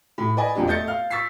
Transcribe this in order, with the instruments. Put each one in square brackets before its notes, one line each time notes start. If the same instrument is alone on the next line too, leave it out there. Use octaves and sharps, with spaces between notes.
[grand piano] A2
B4 D5 D#5 G#5
E1 F2 D4 G4
A3 D#5 G6 A6 C#7
F5 F6
C#6 E6 A6 B6 C7